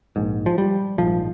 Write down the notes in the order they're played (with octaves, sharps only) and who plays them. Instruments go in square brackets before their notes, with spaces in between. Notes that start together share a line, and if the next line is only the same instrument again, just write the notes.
[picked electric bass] A#1 G#2
F3
G3
A#1 G#2 F3